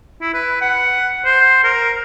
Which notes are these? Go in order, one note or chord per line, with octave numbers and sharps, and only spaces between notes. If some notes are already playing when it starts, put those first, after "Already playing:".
E4
B4
F#5
C5
A#4